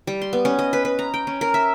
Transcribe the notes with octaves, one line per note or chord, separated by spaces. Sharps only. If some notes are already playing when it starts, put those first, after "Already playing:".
G3
C6
B3
C#4
D#5
B4
B4
A#5
G5
C#4
A#4
E5